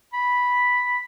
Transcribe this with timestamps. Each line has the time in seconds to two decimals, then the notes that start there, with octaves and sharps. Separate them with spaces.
0.13 B5